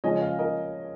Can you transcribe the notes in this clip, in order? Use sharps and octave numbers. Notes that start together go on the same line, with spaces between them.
C#3 F3 G#3 C#4 D#5 G#5
C#5 F5
A#4 D#5